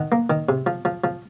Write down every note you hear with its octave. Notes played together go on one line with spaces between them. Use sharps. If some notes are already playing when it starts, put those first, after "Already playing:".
Already playing: D#3 F#5
A#3
D#3
C3
F3
F3
F3